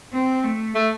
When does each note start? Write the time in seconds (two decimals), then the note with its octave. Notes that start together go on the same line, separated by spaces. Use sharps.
0.13 C4
0.44 A3
0.75 A3